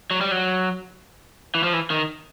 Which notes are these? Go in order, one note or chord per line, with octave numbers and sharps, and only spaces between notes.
F#3
G3
F#3
E3
F3
E3
D#3